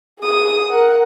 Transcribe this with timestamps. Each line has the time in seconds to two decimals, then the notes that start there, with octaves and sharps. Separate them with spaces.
0.20 G#4 D#6
0.70 A#4 F#5